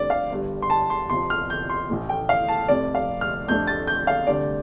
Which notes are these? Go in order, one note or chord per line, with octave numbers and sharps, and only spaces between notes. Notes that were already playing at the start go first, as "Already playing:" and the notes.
Already playing: D2 D3 G3 C4 D5
F5
G1 G2 G3
C6
A5
C6
F2 C3 F3 C6
F6
G6
C6
A1 A2 A3
G5
F5
A5
F1 F2 C3 D5
F5
F6
F1 F2 C3 A3 D4 G6
A6
G6
F5
D2 C3 G3 D4 D5